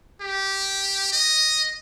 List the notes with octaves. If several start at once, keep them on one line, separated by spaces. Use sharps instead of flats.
G4
D#5